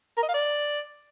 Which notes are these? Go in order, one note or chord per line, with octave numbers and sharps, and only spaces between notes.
A#4
D#5
F5
D5